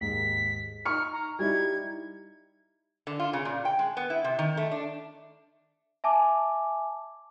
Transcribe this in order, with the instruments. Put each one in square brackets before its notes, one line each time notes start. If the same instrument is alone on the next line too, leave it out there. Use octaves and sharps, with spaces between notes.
[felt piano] D#2 G#2 [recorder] B6
[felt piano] D#4 C#6 C#7 [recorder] F6
[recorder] A#5
[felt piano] G3 D#4 E4 [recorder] G#6
[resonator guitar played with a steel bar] D3
F4
C#3
A#2
G5
G#3
B3
E4
C3
D#3
A3
D4
[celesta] E5 G#5 A5 D6